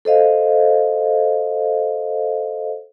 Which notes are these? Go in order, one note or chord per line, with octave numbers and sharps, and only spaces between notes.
A4 C5 D#5 F5